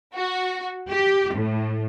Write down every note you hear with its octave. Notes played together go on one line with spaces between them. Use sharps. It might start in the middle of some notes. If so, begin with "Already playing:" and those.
F#4
G4
A2